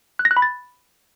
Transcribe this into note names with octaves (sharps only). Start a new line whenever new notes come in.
F#6
A#6
F#6
B5
A6